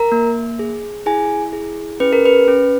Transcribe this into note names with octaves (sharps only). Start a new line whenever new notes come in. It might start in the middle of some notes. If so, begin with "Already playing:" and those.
Already playing: A#4 A#5
A#3
G#4
E4 G#4 G#5
G#4
C#4 B4
A#4
B4
C#4